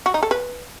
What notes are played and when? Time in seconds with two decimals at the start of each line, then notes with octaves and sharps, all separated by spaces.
0.06 F#4
0.14 D#4
0.23 A4
0.31 B4